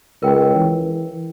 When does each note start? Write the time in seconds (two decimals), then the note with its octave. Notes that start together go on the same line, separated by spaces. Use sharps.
0.23 C#2 A#4 G5
0.55 E3